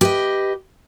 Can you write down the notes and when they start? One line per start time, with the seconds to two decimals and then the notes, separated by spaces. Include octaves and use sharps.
0.01 G4 B4 D#5